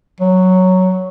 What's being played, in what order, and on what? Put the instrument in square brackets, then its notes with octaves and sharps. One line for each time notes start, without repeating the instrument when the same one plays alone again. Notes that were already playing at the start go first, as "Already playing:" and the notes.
[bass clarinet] F#3